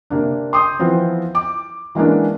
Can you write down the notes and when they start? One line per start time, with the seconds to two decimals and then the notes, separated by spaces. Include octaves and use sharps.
0.10 C3 A#3 D4
0.53 C6 D#6 G6
0.79 E3 F3 B3 C4
1.35 D6
1.95 E3 G#3 A#3 B3 C#4 D4